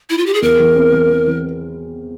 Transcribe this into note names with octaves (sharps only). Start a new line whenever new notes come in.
E4
F4
G4
G#4
E2 A#4
E3
C4
E3
C4
E3